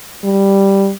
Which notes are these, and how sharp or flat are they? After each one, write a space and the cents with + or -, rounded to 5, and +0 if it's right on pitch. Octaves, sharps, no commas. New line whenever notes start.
G3 +0